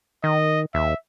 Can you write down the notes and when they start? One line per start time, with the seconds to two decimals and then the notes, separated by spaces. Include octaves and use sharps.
0.24 D#3 D#5
0.74 D#2 E5